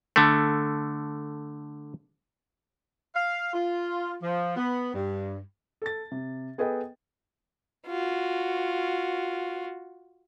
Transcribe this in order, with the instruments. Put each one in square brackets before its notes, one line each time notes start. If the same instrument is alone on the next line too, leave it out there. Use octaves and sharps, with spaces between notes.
[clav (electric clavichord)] D3 A3
[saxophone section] F5
F4
F3
B3
G2
[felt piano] A4 A5 A6
C3
B3 G#4 A4 B4 D#5 G5
[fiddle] F4 F#4